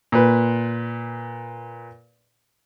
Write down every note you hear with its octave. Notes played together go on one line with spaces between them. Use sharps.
A#2 B4